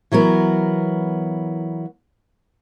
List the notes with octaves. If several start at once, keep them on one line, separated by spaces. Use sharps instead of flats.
E3 F#3 B3 A#4